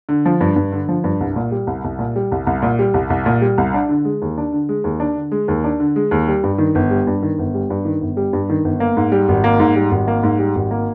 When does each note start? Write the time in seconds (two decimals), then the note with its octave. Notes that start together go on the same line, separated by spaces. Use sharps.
0.09 D3
0.26 F3
0.41 G2
0.56 G2
0.72 D3
0.89 F3
1.04 G2
1.20 C2
1.36 A#2
1.51 G3
1.67 C2
1.84 C2
1.99 A#2
2.16 G3
2.32 C2
2.47 C2
2.62 A#2
2.79 G3
2.94 C2
3.10 C2
3.26 A#2
3.41 G3
3.58 C2
3.74 D4
3.89 D3
4.05 G#3
4.22 D#2
4.38 D4
4.53 D3
4.69 G#3
4.84 D#2
5.00 D4
5.16 D3
5.32 G#3
5.48 D#2
5.64 D4
5.80 D3
5.96 G#3
6.11 D#2
6.28 G3
6.44 G2
6.58 D#3
6.75 G1
6.91 G3
7.07 G2
7.22 D#3
7.39 G1
7.54 G3
7.70 G2
7.85 D#3
8.01 G1
8.17 G3
8.33 G2
8.49 D#3
8.65 G1
8.80 A#3
8.97 G#2
9.12 G3
9.29 G#1
9.44 A#3
9.60 G#2
9.75 G3
9.91 G#1
10.08 A#3
10.23 G#2
10.39 G3
10.55 G#1
10.71 A#3